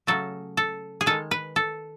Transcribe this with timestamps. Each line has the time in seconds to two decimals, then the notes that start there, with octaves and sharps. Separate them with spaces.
0.07 C#3 F#3 A3 A4
0.57 A4
1.01 G#4
1.06 D#3 G#3 A4
1.31 B4
1.56 A4